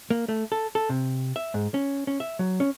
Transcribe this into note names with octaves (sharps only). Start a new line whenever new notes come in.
A#3
A3
A4
A4
C3
E5
G#2
C#4
C#4
E5
F#3
C#4